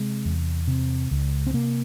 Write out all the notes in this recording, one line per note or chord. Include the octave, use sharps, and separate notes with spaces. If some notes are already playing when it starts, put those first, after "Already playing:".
Already playing: C3 G#3
E2
C3
C#2
C4
C3 A#3